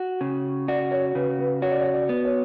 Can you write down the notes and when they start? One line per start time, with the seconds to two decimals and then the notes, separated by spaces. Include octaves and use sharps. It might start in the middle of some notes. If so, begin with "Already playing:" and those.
Already playing: F#4
0.21 C#3
0.68 F#4 D5
0.92 C#5
1.15 C#3 B4
1.39 B4
1.62 F#4 C#5
1.72 D5
1.81 C#5
1.94 D5
2.09 B3
2.25 C#5